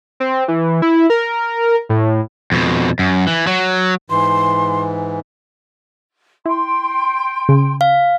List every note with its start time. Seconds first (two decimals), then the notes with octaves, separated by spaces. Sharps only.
0.20 C4
0.48 E3
0.82 E4
1.10 A#4
1.89 A2
2.52 F2 B2
2.99 F#2
3.27 E3
3.47 F#3
4.10 G#2 E3 C6
6.46 E4 G5 C6
7.49 C#3
7.81 F5